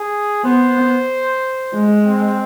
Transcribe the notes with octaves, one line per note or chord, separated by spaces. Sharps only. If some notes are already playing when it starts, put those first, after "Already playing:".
Already playing: G#4
B3 C5
G#3
C4